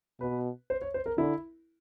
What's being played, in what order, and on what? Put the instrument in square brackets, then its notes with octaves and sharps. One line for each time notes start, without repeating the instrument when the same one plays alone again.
[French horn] B2 [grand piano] B4
[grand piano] C5
C#5
C5
A#4
[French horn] D3 [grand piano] E4